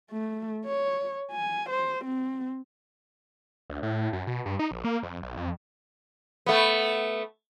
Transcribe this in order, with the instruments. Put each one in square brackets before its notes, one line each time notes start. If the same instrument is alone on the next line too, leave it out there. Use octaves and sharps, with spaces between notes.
[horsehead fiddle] A3
C#5
G#5
C5
C4
[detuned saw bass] D2
A2
A2
F#2
B2
G2
D#4
A#1
A#3
F2
B1
F2
[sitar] A3 B3